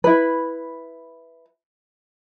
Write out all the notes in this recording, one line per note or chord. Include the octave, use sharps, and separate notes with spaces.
E4 B4